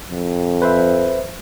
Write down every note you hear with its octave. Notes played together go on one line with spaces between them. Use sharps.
F2
B4 C5 E5